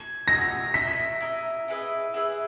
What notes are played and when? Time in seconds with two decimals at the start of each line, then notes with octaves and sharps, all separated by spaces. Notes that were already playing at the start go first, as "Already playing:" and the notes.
Already playing: G#6
0.28 B3 D#4 A#4 A#6
0.74 E4 A#4 D#5 B6
1.21 E4 A#4 D#5
1.68 E4 G#4 B4 D#5
2.14 E4 G#4 B4 D#5